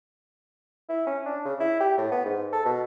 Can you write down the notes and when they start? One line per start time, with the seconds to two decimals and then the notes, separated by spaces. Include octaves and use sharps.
0.89 E4
1.07 C#4
1.26 D4
1.45 C#3
1.60 E4
1.80 G4
1.98 A2
2.12 B3
2.25 G#2
2.53 A4
2.66 B2